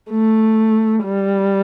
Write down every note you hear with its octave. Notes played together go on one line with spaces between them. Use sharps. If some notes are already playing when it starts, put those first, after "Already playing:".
A3
G3